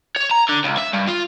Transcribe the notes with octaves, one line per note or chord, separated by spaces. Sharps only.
C#5
A#5
D3
C#2
E5
G2
F4